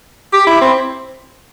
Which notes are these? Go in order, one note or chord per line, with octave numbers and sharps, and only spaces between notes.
G4
E4
C4